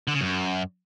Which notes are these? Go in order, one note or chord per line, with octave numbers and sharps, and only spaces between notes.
D3
C#3
F#2